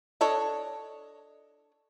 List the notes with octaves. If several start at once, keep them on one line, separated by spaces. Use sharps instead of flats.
D4 A4 C#5 D#5